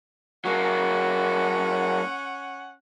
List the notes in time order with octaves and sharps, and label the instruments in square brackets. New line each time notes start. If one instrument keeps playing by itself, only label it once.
[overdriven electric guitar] F#3 A#3 [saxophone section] C#4 F#5